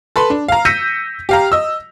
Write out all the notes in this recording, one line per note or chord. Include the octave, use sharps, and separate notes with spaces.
A4 B4 B5 C6
D4
F5 A#5
E6 G6 A#6 B6 C#7 D#7
G4 F5 A#5
D#5 E6